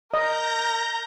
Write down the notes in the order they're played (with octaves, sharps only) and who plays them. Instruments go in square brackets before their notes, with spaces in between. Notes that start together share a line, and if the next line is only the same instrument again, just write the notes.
[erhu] A#4 [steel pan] D#5 [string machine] A#5 G6 A#6